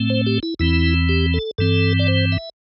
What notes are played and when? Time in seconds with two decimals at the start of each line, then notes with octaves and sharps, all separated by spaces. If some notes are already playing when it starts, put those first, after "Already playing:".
Already playing: A2 A3 C4
0.10 C5
0.26 G4
0.43 E4
0.59 E2 E3 C4 E4
1.09 G4
1.34 A4
1.58 G2 E3 C4 A4
1.99 D5
2.08 C5
2.32 E5